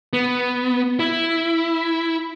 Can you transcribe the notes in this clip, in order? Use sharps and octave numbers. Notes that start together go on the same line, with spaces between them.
B3
E4